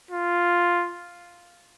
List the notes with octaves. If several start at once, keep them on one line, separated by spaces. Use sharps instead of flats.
F4